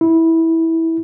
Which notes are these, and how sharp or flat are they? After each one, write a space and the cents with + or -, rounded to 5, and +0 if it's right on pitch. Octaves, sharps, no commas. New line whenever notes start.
E4 -15